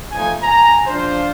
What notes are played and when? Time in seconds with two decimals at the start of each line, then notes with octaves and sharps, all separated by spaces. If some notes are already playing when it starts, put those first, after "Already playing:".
0.12 F3 A3 D#4 G#5
0.43 G#5 A#5
0.87 F3 D4 F4 C5